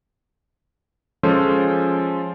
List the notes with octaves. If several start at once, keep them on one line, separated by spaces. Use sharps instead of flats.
F3 G#3 C#4 F4 A4 C5